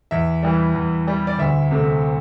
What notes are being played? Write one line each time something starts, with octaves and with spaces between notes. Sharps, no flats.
E2 E5
E3 G3
E2
E3 G3
D5
D2 E5
C3 A3